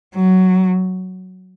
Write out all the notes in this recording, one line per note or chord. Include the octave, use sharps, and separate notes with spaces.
F#3